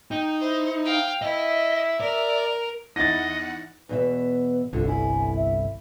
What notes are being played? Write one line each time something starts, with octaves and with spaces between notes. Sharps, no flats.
D#4 G5
E4 C5
F5 G5
E4 D#5 E5
A#4 D5
E2 D#4 E4 D#5 F#5 A6 A#6
E2 B2 B4 E5
G1 C2 D3 F4
E4 G#5
E5